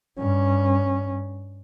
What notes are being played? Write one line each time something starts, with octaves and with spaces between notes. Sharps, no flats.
G2 C#4